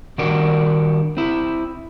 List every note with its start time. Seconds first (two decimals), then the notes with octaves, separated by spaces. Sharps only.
0.18 D#3 G3 D4 F#4 A#4
1.17 C4 E4